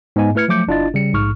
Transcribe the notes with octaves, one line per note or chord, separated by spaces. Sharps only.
G#2 B3 D#5 G#5
A3 E4 B4 F6 G#6 C#7
F3 F#3 A3 D6 G6 C#7
G1 D4 E4 F4 D#5 A6
C#3 G3 C#7
A#1 G#2 C#6 F6